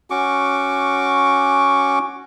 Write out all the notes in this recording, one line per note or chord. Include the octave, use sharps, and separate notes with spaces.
C#4 F#4 C#6 D6